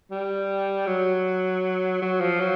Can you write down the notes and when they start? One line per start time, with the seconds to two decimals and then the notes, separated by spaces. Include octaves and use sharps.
0.11 G3
0.87 F#3
2.02 F#3
2.21 F3
2.40 F#3